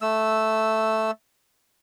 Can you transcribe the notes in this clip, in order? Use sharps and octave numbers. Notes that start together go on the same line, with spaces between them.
A3 E6